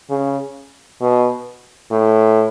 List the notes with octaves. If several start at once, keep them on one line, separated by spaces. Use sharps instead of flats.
C#3
B2
A2